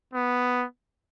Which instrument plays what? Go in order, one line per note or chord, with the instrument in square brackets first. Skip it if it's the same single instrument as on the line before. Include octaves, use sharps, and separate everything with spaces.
[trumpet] B3